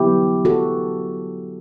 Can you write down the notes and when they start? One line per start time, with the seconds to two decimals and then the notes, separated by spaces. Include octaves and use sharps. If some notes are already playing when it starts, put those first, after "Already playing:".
Already playing: D3 F#3 B3 E4 G4
0.45 F#4 A4